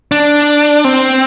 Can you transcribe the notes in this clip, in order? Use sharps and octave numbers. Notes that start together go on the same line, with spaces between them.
D4
C4